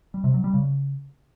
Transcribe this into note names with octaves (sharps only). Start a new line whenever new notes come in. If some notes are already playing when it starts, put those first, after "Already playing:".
G3
C3
F#3
G3
C#3